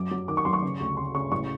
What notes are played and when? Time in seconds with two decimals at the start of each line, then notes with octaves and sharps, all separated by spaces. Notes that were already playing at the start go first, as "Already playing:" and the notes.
Already playing: F#2 D6
0.11 F#3
0.28 D#3 D6
0.37 C#6
0.45 F#3 C6
0.53 C#6
0.62 C#3
0.80 D2
0.97 C#3 C6
1.14 C#3 C#6
1.31 A1 C#6